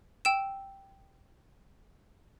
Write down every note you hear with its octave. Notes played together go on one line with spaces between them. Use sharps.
G5 E6 E7